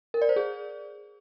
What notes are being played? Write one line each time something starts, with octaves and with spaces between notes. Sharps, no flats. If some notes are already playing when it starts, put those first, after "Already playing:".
A#4
D5
C5
G#4